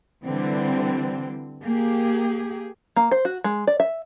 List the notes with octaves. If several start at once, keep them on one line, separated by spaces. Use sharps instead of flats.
D3 E3 G3 C4
A#3 G4 G#4
A#3
C5
F#4
G#3
D5
E5